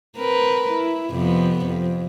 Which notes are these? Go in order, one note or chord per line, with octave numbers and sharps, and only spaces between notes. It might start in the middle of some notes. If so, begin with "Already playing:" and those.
C4 A#4 B4
E4
F2 C3 B3
F2